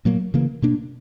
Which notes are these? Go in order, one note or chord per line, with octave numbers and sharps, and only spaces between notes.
A#2 F#3 A#3
C#3 E3 A#3
B2 A#3 D4